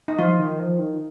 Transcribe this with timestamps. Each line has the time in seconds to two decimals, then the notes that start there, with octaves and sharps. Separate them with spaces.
0.08 D#4
0.18 F3 F4
0.39 D#3
0.60 F3
0.79 D#3